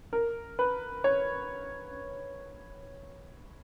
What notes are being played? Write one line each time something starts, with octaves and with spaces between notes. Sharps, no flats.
A#4
B4
C#5